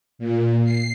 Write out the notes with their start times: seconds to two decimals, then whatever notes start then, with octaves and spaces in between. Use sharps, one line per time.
0.19 A#2
0.64 C7